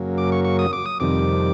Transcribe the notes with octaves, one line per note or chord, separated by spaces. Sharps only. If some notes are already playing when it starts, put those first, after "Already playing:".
Already playing: F#2 C#3 F#3 A#3
D6
C#6
C#6
D#6
D6
D#6
F2 C3 D#3 G3 D6